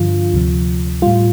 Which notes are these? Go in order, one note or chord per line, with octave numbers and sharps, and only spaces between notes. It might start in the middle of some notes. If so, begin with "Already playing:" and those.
Already playing: G2 D3 F3 F4
D2 C3 F3
A2 G3 F4